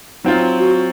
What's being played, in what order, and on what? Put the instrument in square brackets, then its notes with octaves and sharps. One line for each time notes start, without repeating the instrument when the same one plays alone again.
[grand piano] F#3 C4 F4 [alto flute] D#4
[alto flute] F#4